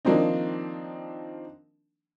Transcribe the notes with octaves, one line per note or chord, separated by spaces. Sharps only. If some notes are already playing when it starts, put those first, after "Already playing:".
D#3 F3 A#3 C4 D4 D#4